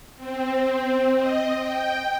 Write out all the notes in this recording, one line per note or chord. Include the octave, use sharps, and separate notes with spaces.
C4
D#5
G5